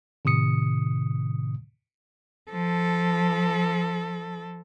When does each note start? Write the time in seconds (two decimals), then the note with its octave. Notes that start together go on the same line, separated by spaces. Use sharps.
0.25 A2 C3 D#3 D#6 C#7
2.50 F3 A4